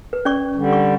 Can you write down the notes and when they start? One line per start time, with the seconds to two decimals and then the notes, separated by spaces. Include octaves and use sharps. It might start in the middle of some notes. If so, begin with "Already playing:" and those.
0.13 B4
0.25 C#4 D5 C#6
0.56 D3 G3
0.73 C#6